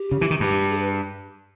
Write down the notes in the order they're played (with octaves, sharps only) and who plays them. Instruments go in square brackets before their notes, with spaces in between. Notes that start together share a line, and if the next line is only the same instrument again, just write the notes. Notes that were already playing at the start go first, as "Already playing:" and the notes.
Already playing: [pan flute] G4
[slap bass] C#3
E3
D#3
[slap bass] G2 [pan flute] G4
[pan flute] G#4
B4